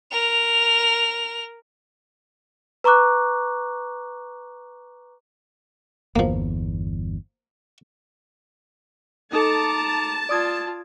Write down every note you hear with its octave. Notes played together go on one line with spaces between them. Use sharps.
A#4 F7
B4 A#5 C#6 D6 F#6
G1 E2 F3 A#3
D#4 A4 A5 A#5 D6 C#7
F4 D5 D#6 G#6